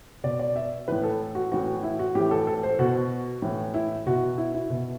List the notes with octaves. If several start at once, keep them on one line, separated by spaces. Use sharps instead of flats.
B2 D5
D5
E5
A2 E3 B4
A4
F#4
A2 E3 F#4
E4
F#4
A2 E3 G4
A4
A4
C5
B2 F#4
A2 E3
E4
B2 F#4
E4
E4
B2